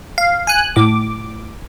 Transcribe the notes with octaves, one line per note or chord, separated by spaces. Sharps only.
F5
G#5 F#6
A2 D6